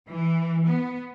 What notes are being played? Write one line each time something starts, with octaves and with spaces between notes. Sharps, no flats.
E3
B3